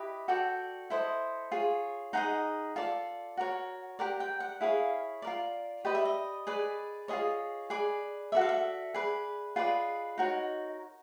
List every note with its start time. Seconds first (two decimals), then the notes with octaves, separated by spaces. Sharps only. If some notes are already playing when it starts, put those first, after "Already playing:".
Already playing: E4 G4 B4 D#5
0.28 F#4 A4 D5 G5
0.90 E4 A4 C5 D#5
1.52 F4 G#4 C#5
2.13 D#4 G#4 C5 D#5 F#5
2.76 F4 A4 D5
3.37 F#4 A#4 C#5
3.99 G4 A#4 D5 F#5
4.20 G5
4.40 F#5
4.61 E4 G#4 C#5 F5
5.22 F4 A#4 D5
5.85 G4 B4 D5 D#5
5.95 E5
6.05 D#5
6.47 G#4 B4 D5
7.08 F4 G#4 C#5 D#5
7.70 G#4 B4 D5
8.32 F#4 A4 D5 E5
8.41 F5
8.49 E5
8.94 G#4 B4 D5
9.56 F4 G#4 B4 D5 D#5
10.18 D#4 F#4 A#4 C#5